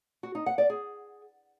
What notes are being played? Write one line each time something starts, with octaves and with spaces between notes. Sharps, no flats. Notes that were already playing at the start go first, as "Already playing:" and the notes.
F#4
D#4
F#5
D5
G#4